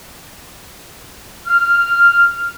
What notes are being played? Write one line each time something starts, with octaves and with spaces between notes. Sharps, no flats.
F6